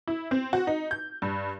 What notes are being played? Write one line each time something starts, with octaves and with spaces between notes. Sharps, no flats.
E4
C4
F#4
D#4
G6
G2